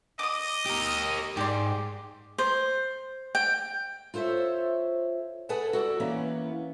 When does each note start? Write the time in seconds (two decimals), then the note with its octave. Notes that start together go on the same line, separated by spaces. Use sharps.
0.19 D#5 D6 D#6
0.66 G4 A#4
1.37 G#2 G4 D5 C6
2.38 C5
3.35 G5
4.14 F4 A4 C5 C#5 E5
5.49 G#4 A4 B4 F#5 G#5 A5
5.73 F#4 A4 D5
6.00 E3 A#3 B3 C#4